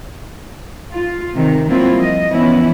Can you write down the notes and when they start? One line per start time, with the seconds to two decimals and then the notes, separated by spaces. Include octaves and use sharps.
0.92 F4
1.36 C3 D#3
1.69 F#3 G3 A#3 C4 E4 F4
1.98 F3 D#5
2.32 E3 F3 B3 C#4 E4